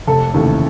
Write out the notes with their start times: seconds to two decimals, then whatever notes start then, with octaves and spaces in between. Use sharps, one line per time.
0.07 F1 A4 A5
0.34 D#2 C#3 E3 A3